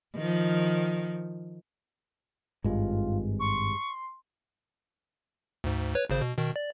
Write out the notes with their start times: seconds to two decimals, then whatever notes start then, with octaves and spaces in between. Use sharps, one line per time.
0.15 D#3 F3
2.64 G#1 G2 G#3 F4
3.40 C6 C#6
5.64 D2 G#2
5.95 B4 C#5
6.10 G#1 C#3 C5
6.21 B2
6.38 B2 D#3
6.56 D5